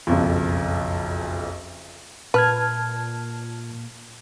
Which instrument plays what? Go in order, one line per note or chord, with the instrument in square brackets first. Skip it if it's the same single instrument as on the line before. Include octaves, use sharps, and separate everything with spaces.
[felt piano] F#1 B1 F2
[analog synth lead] A#2 [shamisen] B4 [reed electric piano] A5 F6 G#6